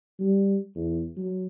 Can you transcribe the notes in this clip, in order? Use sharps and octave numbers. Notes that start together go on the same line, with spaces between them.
G3
E2
F#3